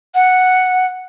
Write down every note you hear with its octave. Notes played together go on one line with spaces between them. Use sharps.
F#5